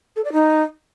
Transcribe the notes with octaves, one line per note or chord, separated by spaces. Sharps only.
A4
D5
D#4